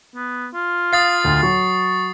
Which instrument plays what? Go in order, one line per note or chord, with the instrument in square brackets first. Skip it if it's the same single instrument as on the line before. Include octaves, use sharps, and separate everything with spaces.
[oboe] B3
F4
[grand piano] F5 [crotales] D#6 A6 C7
[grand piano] D2
[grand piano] F#3 [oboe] C#6